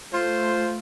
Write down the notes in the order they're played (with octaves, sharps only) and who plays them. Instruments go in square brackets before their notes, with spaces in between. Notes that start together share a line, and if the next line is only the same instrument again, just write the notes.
[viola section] A3 [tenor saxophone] F4 [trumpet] C5